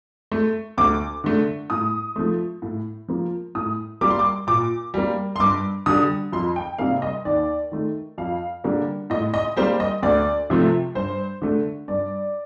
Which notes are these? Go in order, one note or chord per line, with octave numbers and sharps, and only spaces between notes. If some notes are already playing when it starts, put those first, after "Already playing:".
A3
D2 D6
D3 A3
A2 D#6
F3 A3
A2
F3 A#3
A2 D#6
G3 A#3 D6
C6
D6
A#2 D6
G3 A#3
C6
G2 D6
D3 G3 D#6
F2 C6
G5
C3 G3 A#3 F5
D#5
D#2 D5
D#3 A3
F2 F5
D3 G3 A#3
A2 D#5
D#5
G3 A#3 C5
D#5
D2 D5
C3 F3 A3
G2 C5
D3 A3
G2 D5